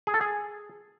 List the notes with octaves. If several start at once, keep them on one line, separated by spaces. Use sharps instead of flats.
G#4
A4
G#4